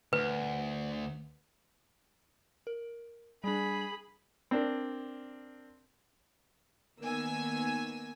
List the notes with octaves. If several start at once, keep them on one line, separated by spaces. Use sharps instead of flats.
D2 B4
A#4
G3 D4 G#4 B5
C4 D4 A#4
D#3 A#3 B3 G#5 E6